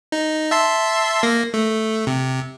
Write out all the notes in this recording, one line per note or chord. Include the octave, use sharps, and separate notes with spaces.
D#4
E5 A5 C6
A#3 A#6
A3
C3